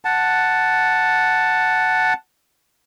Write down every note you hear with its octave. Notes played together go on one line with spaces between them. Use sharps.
F#5 A5